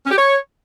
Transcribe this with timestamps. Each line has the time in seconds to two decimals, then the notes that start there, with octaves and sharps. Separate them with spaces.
0.04 C#4
0.10 G4
0.16 C#5